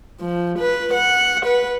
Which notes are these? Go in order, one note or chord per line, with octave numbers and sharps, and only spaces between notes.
F3
B4
F#5
B4